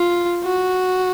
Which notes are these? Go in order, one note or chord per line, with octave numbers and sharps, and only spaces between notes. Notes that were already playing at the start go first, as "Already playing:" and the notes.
Already playing: F4
F#4